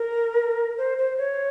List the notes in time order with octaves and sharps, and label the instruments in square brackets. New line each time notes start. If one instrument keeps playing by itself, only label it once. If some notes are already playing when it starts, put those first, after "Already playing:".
Already playing: [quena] A#4
C5
C5
C#5